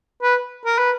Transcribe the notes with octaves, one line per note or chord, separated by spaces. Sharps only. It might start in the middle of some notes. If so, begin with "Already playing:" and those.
B4
A#4
B4